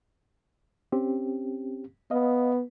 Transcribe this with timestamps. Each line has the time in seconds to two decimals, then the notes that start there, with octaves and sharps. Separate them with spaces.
0.92 C4 C#4 G4
2.11 B3 D#5 F5